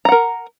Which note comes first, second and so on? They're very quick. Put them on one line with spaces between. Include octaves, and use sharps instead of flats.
A#5 F#5 A#4